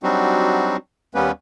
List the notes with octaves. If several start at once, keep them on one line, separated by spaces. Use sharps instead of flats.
F#3 G3 C4 D4 D#4 F#4
D#2 G3 A#3 B3 C#4 B4